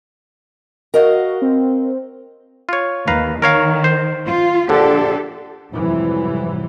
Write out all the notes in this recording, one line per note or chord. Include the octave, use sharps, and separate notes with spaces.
F#4 A#4 D#5 F5
C4
F4 C#5
D#2 B4 F5 A#5
D#3 A#4 C#5 F5
C5
F4
A#1 D3 D4 G4 A4
F2 G#2 C3 E3 F#3 G3